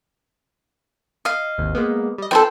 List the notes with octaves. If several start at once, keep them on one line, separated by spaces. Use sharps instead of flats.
D#5 F5
G#1 D#2
G#3 A#3 B3
G3 D#5
F3 D#4 A4 B4 C5 G5